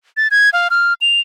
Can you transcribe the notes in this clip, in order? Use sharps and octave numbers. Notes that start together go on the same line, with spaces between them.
A6
G#6
F5
F6
F7